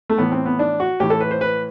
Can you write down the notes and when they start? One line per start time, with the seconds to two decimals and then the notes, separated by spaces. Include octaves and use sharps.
0.10 A3
0.18 A2 E3 B3
0.32 C4
0.46 B3
0.59 D4
0.80 F#4
1.00 A2 E3 G4
1.10 A4
1.20 B4
1.31 C5
1.41 B4